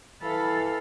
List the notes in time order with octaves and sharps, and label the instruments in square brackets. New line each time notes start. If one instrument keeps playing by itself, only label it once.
[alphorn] E3 [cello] A4 F5 [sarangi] B5